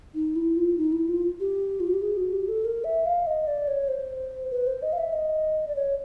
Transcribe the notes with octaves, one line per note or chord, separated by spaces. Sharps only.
D#4
E4
F4
D#4
E4
F4
G4
F4
F#4
G4
G#4
F#4
G4
A4
A#4
E5
F5
D#5
D5
C#5
C5
B4
C5
D#5
F5
E5
D#5
D5
C#5